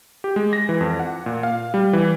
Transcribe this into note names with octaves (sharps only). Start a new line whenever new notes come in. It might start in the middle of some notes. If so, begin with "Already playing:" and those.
G4
G#3
A#6
E3
F2
F#5
A#2
F5
G3
E3